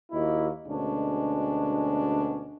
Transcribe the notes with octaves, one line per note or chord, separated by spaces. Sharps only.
D#2 A#3 E4 F#4 D#5
D2 B2 G#3 C#4 D4